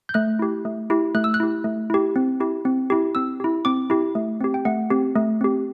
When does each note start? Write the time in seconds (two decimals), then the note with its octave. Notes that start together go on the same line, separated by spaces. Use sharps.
0.09 G6
0.14 A3 F#6
0.39 E4 G4
0.65 A3
0.90 E4 G4
1.14 A3 F#6
1.24 E6
1.34 F#6
1.40 E4 G4
1.64 A3
1.90 E4 G4
2.16 C4
2.40 E4 G4
2.65 C4
2.90 E4 G4
3.15 C4 E6
3.40 E4 G4
3.65 C4 D6
3.90 E4 G4
4.15 A3
4.41 C4 G4
4.54 G5
4.65 A3 F#5
4.90 C4 G4
5.16 A3
5.41 C4 G4